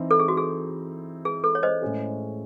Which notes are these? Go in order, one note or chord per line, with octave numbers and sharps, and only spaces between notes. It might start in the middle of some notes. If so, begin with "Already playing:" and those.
Already playing: E3 C4 D#4
A4
G#4
F#4
G#4
G#4
A4
C#5
C5 D#5
A2 G#3 C#4 G#4